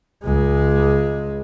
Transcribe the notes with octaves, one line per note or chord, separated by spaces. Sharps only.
C#2 G#3